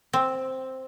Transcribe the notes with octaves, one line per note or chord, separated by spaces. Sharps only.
C4